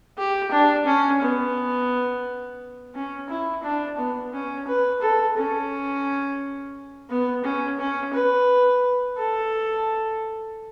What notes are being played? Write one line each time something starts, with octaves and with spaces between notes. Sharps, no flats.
G4
D4
C#4
B3
C#4
E4
D4
B3
C#4
B4
A4
C#4
B3
C#4
C#4
B4
A4